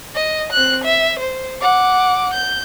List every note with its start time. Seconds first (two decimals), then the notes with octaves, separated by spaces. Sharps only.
0.15 D#5
0.52 C4 F#6
0.84 E5
1.19 C5
1.62 F#5 D6
2.33 G6